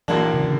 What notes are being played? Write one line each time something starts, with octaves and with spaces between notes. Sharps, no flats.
A#1 A#2 E3 F#3 A#3 D4
C#3
D3